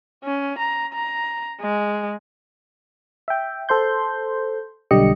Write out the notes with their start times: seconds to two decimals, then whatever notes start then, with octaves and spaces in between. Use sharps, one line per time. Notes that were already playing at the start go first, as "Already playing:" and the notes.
0.24 C#4
0.58 A#5
0.93 A#5
1.61 G#3
3.28 E5 G5
3.69 A4 C5 C6 G6
4.91 B1 D3 G3 G4 D#5 C#7